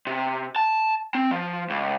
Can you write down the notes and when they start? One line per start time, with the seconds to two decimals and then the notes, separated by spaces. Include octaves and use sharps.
0.07 C3
0.56 A5
1.15 C4
1.31 F3
1.70 C#2